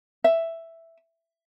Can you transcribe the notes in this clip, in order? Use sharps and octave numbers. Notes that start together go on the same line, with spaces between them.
E5